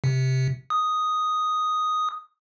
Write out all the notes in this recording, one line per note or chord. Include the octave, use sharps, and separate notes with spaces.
C3
D#6